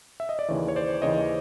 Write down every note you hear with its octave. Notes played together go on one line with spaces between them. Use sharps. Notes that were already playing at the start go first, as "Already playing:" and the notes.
E5
D#5
D5
D#2 C#3 E3 C#5
C#5
C5 D5
D#2 C#3 E3 C#5 D#5